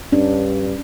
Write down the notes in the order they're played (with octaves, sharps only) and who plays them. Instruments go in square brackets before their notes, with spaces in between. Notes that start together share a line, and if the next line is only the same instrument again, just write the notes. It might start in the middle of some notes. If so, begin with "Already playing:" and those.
[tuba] G2 [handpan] C#4 D4